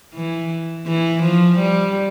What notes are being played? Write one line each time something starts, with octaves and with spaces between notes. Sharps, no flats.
E3
E3
F3
G3